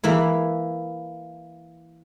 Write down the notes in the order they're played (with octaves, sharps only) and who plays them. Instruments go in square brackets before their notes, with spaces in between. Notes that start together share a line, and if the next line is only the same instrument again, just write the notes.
[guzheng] E3 A#3 E4